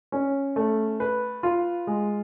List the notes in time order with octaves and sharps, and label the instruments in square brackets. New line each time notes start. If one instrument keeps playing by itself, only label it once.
[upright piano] C#4
A3
B4
F4
G#3